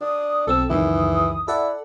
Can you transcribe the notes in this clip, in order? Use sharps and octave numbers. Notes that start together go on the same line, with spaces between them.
D4 D#6
B1 C4 A4 E6
C#2 F#2 D#3 E3 D#6
E4 A4 D5 F#5